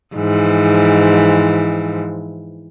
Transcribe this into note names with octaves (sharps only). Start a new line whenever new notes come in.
G#2 E3 F3